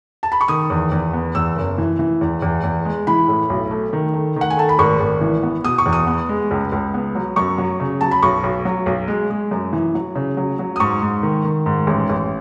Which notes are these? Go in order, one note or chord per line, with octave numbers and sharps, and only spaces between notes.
A5
B5
C#6
D#3 D#6
E2
E2
B3
E2 E6
F#1
E3
E3
E2
E2
E2
G#3
E3 B5
A2
B1
A3
D#3
A3
D#3 F#5
G#5
A3 A5
B5
G#1 C#6
G#1
E3
B3
B2 D#6
C#6
E2
D#6
B3
G#3
C#2
C#2
B3
F#3
F#2 C#6
F#3
C#3
F#3 A5
B5
B1 C#6
B1
F#3
B1
G#3
G#3
F#2
E3
F#3
C#3
F#3
F#3
D#6
G#2 C#6
G#2
D#3
D#3
G#2
A1
A1